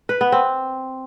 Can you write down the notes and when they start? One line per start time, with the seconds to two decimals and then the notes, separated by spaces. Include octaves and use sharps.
0.09 B4
0.21 B3
0.32 C4